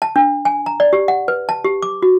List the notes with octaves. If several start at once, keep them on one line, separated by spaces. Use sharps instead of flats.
A5
D4
G#5
A#5
D5
G4
F#5
B4
A5
G4
D6
F#4